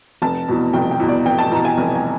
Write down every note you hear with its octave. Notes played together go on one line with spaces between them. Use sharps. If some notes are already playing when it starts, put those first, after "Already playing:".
F1 A5
E2 B2
F1 G5
G5
E2 B2
D5
F1 G5
A5
E2 B2 A#5
G#5
F1
G#5